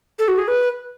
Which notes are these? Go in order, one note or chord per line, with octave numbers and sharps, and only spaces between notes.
A4
F#4
G#4
B4